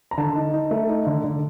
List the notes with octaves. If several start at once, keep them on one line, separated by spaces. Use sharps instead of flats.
A#5
D3 A5
D#4
D#4
A3
D#4
D3
D3